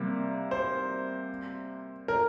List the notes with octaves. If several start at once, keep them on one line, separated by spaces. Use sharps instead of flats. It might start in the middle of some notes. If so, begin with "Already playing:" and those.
Already playing: C3 G3 A#3
C5
A#4